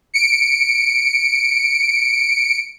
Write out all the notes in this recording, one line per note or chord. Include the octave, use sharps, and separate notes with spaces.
C#7 D7